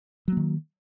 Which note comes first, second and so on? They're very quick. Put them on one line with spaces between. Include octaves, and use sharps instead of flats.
F#3 A#3 D#3